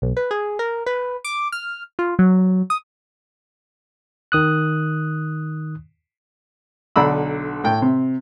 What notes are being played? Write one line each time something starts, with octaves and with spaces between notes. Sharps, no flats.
B1
B4
G#4
A#4
B4
D6
F6
F4
F#3
D#6
D#3 D#6 F#6
B1 D3 D5 A#5 B5 E6
A2 G5
C3